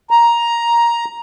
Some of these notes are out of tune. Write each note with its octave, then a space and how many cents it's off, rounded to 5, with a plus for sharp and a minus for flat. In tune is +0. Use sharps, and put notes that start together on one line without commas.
A#5 +10